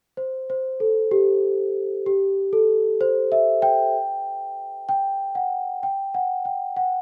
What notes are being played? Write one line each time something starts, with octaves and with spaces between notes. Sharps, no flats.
C5
C5
A4
G4
G4
A4
C5
E5
G5
G5
F#5
G5
F#5
G5
F#5